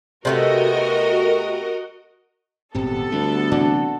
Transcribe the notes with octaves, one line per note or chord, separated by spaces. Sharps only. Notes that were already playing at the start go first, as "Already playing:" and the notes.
C3 A3 B3 F#4 A#4 D#5
D#1 G#1 C3 B3 A4
D2 G3
C3 E3 F#3 D4 F#4